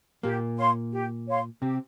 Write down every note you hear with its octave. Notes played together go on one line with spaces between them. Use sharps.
A#2 A#3 G4
C#5 F5 C6
G4
C#5 F5 C6
C3 C4 G4